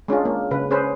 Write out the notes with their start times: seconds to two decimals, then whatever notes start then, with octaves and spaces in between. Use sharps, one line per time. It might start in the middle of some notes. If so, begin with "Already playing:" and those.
0.08 G#3 C#4 D4 F4
0.25 A#3
0.51 C#3 B4
0.71 C#4 G#4 B4 C5